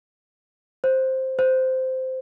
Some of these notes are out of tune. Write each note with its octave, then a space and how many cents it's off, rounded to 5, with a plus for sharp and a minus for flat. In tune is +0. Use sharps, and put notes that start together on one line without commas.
C5 +5
C5 -10